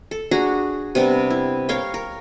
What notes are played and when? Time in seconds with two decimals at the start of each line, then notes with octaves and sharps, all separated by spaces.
0.11 A4
0.31 D4 F#4 G#4 A#5
0.95 C3 G3 B3 D4
1.30 E4
1.69 A#4 C#5 F5 G5
1.94 A#4